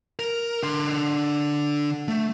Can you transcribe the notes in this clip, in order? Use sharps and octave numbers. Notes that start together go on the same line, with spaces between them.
A#4
D3 C6
A3